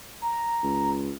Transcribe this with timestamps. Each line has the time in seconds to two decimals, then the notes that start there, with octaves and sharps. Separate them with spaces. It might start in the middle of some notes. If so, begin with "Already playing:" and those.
0.22 A#5
0.63 C#2